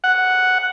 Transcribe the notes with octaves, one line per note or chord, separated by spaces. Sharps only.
F#5